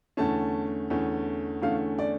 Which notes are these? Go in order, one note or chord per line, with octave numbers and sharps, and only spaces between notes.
E2 D3 A3 C#4 A5
E2 D3 A3 C#4
E2 D3 A3 C#4 F5
D5